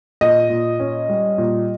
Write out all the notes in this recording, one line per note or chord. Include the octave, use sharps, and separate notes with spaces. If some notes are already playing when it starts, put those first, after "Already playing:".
A#2 D#5
A#2
C#4
G3
A#2